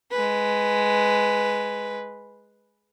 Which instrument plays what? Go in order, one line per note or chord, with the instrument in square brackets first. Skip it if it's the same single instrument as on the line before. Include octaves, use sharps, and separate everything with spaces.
[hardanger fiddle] G#3 B4